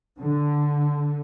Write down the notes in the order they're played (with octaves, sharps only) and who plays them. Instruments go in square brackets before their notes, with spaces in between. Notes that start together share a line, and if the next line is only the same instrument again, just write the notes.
[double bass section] D3